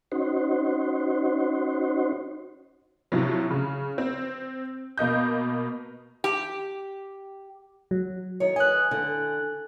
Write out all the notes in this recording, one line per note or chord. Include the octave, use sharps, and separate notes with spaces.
C#4 D#4 F#4 C5
A2 C3 F3 F#3
C#3
C4
B2 A#3 D#5 G6
G4
F#3
D#3 C#5
B4 D#5 G#5 F#6
D3